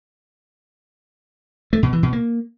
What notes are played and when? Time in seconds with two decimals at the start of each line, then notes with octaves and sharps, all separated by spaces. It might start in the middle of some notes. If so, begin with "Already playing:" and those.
1.73 A3
1.83 B2
1.93 E3
2.03 B2
2.13 A#3